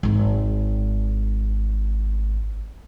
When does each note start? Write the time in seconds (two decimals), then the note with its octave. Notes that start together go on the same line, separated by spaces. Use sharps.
0.03 G#1 D#4